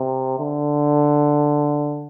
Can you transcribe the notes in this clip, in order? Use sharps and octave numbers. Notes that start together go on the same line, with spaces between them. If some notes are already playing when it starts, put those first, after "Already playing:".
Already playing: C3
D3